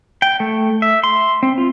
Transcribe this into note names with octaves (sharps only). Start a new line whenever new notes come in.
G5
A3
E5
C6
C4
F4